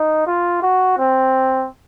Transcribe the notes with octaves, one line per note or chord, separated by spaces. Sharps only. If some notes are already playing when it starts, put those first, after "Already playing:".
Already playing: D#4
F4
F#4
C4